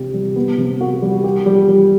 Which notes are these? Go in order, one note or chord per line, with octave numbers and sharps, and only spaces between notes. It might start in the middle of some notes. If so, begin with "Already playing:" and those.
Already playing: C3 D4 G4
G3
B3
C3
F#4
G3
G4
G3
G3